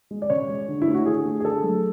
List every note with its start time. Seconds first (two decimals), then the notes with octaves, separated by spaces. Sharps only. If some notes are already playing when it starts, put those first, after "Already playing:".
0.11 G#3
0.22 D5
0.30 C#3 C#5
0.49 G#3
0.68 D3
0.82 E4
0.88 A3
0.94 F#4
1.06 D3 G#4
1.25 A3
1.40 G#4
1.44 D3 A4
1.63 F#3 A3